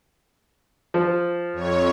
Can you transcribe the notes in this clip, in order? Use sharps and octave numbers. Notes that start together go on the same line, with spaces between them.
F3
F2 C#5